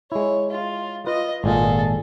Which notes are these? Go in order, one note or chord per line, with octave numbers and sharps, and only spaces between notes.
G#3 E4 C#5
F4
F4 B4 D#5
G#1 A#2 F4 G#4 A4